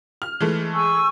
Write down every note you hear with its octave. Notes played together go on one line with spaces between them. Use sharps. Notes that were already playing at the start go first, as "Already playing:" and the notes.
F6
E3 G#3 A3
G#5 C#6 E6